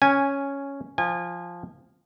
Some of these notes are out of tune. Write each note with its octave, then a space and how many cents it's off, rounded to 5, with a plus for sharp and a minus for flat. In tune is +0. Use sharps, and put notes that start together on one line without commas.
C#4 +0 G#5 -5
F3 +0 G#5 -30